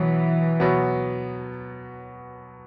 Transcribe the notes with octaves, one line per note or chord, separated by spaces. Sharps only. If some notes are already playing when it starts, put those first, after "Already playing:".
Already playing: B2 E3 F#3 B3
B2 F#3 B3